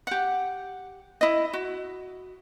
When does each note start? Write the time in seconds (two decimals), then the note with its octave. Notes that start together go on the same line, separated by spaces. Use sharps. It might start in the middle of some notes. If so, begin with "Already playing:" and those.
0.07 G4 F#5
1.21 E4 D#5
1.53 F#4